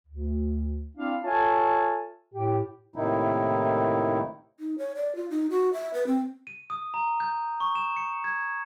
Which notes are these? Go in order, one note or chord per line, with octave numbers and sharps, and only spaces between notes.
D2
C4 D4 E4 F5
F4 A4 C#5 E5 G#5 A5
A2 G4
A2 C3 D#3 A#3 D#4 E4
D#4
C#5
D5
F4
D#4
F#4
E5
B4
C4
D#7
D#6
A#5
G6
C#6
E7
C#7
G#6